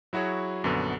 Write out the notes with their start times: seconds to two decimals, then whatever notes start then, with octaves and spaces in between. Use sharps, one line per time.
0.13 F#3 E4 F#4 G#4 C#5
0.63 A#1 F#2 D3 B3 F#4 A4